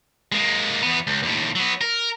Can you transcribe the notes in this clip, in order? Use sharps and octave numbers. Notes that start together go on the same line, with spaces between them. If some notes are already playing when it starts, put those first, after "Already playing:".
G#3 A#3
E2 B3
C#2
D#2 A2
F#3 B3
A#4